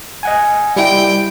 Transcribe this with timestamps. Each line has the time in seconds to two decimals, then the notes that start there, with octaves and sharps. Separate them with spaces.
0.23 D#5 F#5 G#5
0.76 G3 E4 G5